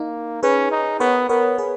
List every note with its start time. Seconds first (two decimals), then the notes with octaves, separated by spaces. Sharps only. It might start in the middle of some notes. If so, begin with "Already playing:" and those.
Already playing: A#3 D#4
0.43 C#4 G#4 B4
0.71 D#4
1.00 B3 A#4 C#5
1.29 B3 A#4 C#5
1.58 G#4 B4